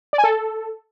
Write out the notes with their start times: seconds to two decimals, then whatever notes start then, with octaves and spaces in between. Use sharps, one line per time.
0.13 D5
0.18 G#5
0.24 A4